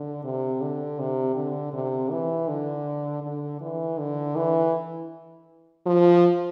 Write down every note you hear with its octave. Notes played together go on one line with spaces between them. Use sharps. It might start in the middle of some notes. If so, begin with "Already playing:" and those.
Already playing: D3
C3
D3
C3
D3
C3
E3
D3
D3
E3
D3
E3
F3